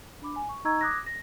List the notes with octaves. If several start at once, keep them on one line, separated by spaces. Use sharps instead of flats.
D4 B5 D6
G#5
C#6
D#4 D#5 A#5 C#6 E6 G#6
D6 D#6 F#6 G#6 A#6
A#6